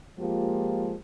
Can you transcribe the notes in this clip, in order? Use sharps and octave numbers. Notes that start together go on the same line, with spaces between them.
F3 G#3 A#3 F4 G4